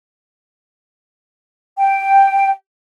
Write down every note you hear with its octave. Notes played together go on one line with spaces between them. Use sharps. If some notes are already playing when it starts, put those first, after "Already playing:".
G5